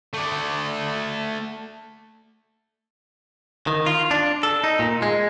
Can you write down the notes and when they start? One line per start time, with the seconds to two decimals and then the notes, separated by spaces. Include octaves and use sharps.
0.14 A3 D5
3.67 D#3
3.86 F4
4.11 D4
4.43 A4
4.64 D#4
4.79 A#2
5.02 G#3